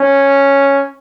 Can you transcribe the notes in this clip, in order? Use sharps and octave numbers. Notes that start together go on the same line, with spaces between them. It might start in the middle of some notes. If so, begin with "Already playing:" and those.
Already playing: C#4